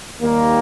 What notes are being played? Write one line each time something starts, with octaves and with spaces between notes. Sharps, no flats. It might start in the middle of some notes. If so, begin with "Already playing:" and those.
D#2 D#3 G3 A#3